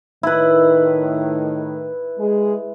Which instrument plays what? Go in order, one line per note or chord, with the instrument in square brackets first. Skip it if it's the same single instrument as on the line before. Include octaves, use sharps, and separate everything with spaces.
[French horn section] A2 D#3 [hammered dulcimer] E4 B4
[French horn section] G#3 G#4